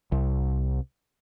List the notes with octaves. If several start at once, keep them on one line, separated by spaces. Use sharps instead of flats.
C2